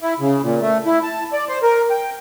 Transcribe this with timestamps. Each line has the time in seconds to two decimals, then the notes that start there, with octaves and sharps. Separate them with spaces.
0.01 E4
0.20 C#3
0.42 A#2
0.61 A3
0.86 E4
1.03 A5
1.33 D5
1.49 C5
1.63 A#4
1.90 G5